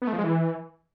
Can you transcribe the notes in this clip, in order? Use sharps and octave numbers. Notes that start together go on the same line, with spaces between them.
B3
A3
F3
G#3
E3